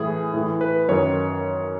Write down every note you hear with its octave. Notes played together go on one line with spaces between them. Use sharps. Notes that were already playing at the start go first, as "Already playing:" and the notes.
Already playing: A2 E3 G#4
A2 E3
B4
F#2 D#3 C#5